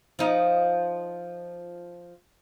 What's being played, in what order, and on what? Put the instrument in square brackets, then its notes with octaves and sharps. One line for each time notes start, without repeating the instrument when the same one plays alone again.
[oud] F3 D#4